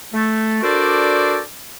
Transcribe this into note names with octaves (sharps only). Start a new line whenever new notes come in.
A3
D4 F#4 A4 A#4 C5 D5